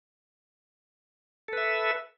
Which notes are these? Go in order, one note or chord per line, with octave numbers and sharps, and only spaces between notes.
A4 B4 E5